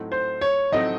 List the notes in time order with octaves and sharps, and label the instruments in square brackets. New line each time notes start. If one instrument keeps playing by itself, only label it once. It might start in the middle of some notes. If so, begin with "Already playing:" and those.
Already playing: [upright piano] A2 F#3 A3 C4 D#4
[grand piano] C5
C#5
[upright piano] A2 F#3 A3 C4 D#4 [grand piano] D#5